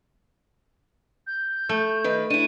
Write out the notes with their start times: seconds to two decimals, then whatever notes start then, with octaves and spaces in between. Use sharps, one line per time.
1.27 G6
1.69 A3
2.04 D#3 B4
2.30 D4 E4 D#7